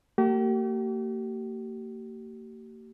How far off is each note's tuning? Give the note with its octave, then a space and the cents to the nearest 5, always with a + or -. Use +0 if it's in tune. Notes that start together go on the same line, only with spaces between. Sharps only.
A#3 -40 G4 -40